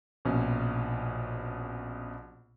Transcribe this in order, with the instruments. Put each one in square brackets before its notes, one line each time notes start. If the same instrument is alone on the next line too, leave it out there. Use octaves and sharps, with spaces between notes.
[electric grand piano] A#1 B2 C#4